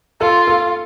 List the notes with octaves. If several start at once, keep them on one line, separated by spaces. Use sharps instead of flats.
F4 A4
A4